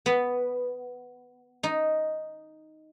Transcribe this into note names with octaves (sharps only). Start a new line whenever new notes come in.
B3
D#4